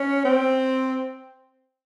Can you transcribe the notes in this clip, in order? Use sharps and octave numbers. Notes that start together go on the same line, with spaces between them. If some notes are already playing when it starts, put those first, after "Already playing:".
Already playing: C#4
C4